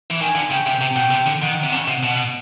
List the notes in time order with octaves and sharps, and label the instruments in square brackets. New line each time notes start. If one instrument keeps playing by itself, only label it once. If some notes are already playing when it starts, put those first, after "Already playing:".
[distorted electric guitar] E3
[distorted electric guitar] D#3 [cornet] G#5
[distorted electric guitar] D3
[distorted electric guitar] C#3 [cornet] G5
[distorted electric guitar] C3
C3
B2
C3
D3
[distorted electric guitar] D#3 [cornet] F#5
[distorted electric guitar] C3
[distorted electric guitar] C#3 [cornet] F#5
[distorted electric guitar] C3
B2